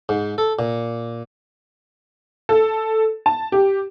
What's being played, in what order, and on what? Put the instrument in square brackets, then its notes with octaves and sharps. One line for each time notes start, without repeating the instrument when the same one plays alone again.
[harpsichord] G#2
A4
A#2
[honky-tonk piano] A4
A5
G4